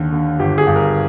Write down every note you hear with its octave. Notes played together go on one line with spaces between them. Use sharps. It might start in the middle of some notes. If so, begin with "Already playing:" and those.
Already playing: D#2 D3
D3
G1 G4
G#4
G2
A#4